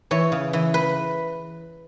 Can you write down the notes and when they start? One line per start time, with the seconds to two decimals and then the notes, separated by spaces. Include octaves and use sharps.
0.11 E3 C#5
0.32 C#3
0.53 E3
0.74 B4